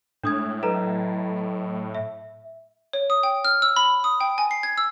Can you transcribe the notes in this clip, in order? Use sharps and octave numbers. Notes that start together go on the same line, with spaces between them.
A2 G#3 D4 D#6 G#6
F#3 A4 B4 D#5 A#5
E5
C#5
D#6
G5
F6
E6
B5
D#6
G5
G#5
C7
G#6
E6